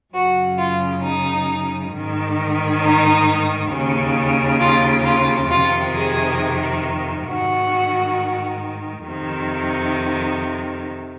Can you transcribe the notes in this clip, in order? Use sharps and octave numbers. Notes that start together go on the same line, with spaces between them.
F#2 C#3 F#4
F4
D#4
G#2 D#3
D#4
D#2 C#3
F4
F4
F2 C3 D#3 F4
G#4
G#2 D#3 F#4
F2 C3 D#3